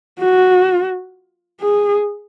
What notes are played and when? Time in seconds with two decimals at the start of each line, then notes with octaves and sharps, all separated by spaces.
0.20 F#4
1.61 G#4